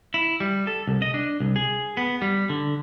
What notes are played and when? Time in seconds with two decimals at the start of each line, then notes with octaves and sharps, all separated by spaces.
0.14 E4
0.40 G3
0.67 A4
0.87 C2
1.02 D#5
1.14 D4
1.40 C2
1.56 G#4
1.97 B3
2.22 G3
2.49 D3